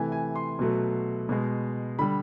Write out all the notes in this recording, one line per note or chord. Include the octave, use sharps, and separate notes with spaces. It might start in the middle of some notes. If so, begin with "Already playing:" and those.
Already playing: C3 E3 A3 G#5
G#5
C6
B2 F#3 A3
B2 G#3
D3 G3 B5